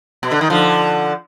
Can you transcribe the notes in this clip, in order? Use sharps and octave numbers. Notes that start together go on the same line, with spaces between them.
B2
D3
D#3
D3 F3